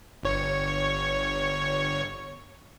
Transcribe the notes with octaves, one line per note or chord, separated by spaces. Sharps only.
G1 C#5 C#6